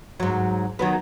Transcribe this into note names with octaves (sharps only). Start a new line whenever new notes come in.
G#2 F#3
D#3 F#3 B3